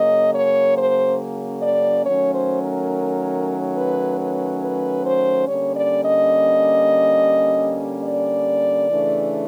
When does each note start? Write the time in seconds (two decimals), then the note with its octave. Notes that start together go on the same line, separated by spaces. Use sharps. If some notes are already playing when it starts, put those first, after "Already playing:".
Already playing: C#3 F#3 A#3 C#4 D#5
0.35 C#5
0.77 C5
1.63 D5
2.05 D#3 F#3 A3 C#4 C#5
2.34 C5
2.62 A#4
3.77 B4
4.19 B4
4.62 B4
5.05 C5
5.47 D3 G3 A#3 C#4 C#5
5.76 D5
6.04 D#5
8.04 D5
8.89 C#3 E3 A3 D4